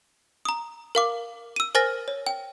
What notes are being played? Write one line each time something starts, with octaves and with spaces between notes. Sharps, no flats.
A#5 D#6
A#4 F5 D6
E6 D#7
A#4 C5 G#5 F6 A6 A#6
C#5
G5